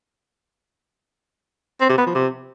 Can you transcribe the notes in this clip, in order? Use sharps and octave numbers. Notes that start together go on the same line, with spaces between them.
C4
C3
B3
F3
C3